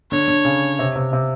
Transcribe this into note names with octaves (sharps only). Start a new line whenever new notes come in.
D3 C#5
D3
C#3
C3
C3
C3